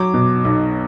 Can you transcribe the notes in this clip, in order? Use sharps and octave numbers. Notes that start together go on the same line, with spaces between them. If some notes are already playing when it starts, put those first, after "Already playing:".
Already playing: F#3 D6
B2
B1